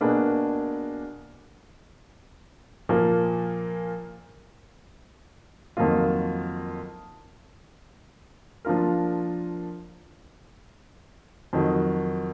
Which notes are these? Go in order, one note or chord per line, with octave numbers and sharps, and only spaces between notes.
B2 A#3 D4 G#4 B4
A#2 F3 A#3
F2 D#3 F#3 A#3 F4
F3 A#3 D4 F4 A#4
F2 D#3 F#3